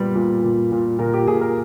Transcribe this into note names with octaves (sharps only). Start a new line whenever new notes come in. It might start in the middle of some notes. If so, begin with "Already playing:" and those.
Already playing: A#2 G3 B3
A#2
A#2
A#2
A#2 A#4
G4
A#2 G#4
A#4